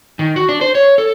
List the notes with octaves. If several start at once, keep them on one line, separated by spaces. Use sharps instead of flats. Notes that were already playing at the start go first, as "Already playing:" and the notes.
D#3
F#4
D4
C5
C#5
A4